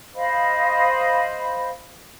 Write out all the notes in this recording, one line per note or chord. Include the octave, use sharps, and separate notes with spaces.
C5 D#5 F5 B5